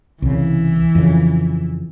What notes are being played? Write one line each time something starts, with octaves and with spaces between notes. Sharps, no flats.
C2 C#3 E3
F2 C#3